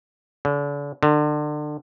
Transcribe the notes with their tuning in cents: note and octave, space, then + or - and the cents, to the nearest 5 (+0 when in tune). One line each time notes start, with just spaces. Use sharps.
D3 -40
D3 +30